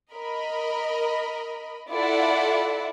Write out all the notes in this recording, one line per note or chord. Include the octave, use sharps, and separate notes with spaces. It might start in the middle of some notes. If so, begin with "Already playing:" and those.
A#4 D#5 B5
E4 F4 A4 D5 E5 F#5